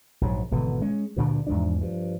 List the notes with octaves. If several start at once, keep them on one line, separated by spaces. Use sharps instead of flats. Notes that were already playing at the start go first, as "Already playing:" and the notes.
A#1 G#2 F#3
G#1 B2 D3 E3
G#3 C#4
D2 G2 A#2 D3
E2 G#2 F3 D4
G2 F3